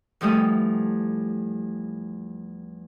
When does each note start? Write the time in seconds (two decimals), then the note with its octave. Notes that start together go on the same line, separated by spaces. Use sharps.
0.21 E2 F3 G3 A3 D#6